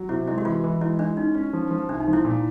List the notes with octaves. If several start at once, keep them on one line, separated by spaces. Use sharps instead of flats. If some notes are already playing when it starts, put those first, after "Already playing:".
Already playing: F#3
C3 E4
G#3 E4
F#4
E3 F4
E3
G#3 E4
G#3 D4
C#4 D#4
C#4
F3
F3
C2 D4
D#4
F3
E4
A#2